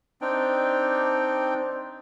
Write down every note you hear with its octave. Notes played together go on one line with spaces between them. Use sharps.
C4 D4 D#4 G5